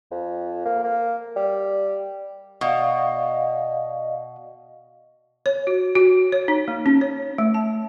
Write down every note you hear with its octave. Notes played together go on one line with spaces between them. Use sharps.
F2
A#3
A#3
G3
B2 D5 D#5 F5
C#5
F#4
F#4
C#5
D#4
A#3
C#4
C#5
A3
A5